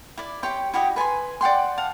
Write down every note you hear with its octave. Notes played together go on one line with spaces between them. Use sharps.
E4 D5
G4 C#5 G5 C6
E4 F#4 G4 D#5
B4 G#5 A5 C6
D5 F#5 G5 C6
F5 F#5 A5